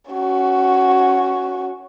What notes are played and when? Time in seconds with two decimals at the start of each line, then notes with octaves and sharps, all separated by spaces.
0.11 C#4 F#4